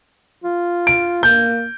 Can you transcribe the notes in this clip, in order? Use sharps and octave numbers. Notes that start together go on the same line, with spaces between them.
F4
D7
A#3 G6